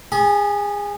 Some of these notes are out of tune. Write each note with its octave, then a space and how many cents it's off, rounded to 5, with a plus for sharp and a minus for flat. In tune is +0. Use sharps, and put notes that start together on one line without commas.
G#4 -25 G#5 +45 B5 -25